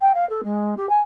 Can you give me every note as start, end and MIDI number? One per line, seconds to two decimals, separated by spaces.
0.01 0.12 79
0.14 0.28 77
0.30 0.41 69
0.44 0.75 56
0.77 0.89 67
0.89 1.00 80